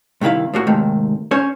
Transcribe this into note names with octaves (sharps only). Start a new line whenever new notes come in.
G2 C3 D#3 E4 F5
A2 A#3 F#4
D#2 G#2 C3 D#3 A3
C#4 C5 C#5